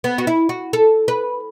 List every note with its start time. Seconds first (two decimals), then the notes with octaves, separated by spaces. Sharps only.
0.04 B3
0.18 F#4
0.27 E4
0.49 F#4
0.73 A4
1.08 B4